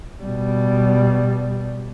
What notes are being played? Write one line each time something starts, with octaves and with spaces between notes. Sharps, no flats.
B2 G3